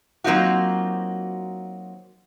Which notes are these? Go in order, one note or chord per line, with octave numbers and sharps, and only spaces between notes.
F#3 A#3 C4 D#4 F4 F#4